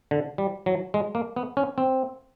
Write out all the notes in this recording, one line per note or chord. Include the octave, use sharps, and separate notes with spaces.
D3
G3
F#3
G#3
A#3
B3
C#4
C4